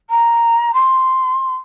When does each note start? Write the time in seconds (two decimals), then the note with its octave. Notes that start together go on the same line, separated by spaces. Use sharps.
0.10 A#5
0.74 C6